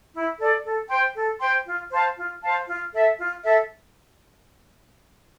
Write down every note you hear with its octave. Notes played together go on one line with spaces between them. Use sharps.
E4
A4 D5
A4
C5 G5 C6
A4
C5 G5 C6
F4
C5 F5 A5
F4
C5 F5 A5
F4
A4 E5
F4
A4 E5